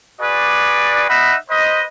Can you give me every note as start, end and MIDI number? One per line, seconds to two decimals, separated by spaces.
0.21 1.08 66
0.21 1.08 68
0.21 1.08 71
0.21 1.08 74
1.09 1.36 63
1.09 1.36 75
1.09 1.36 76
1.09 1.36 78
1.09 1.36 83
1.50 1.84 71
1.50 1.84 72
1.50 1.84 75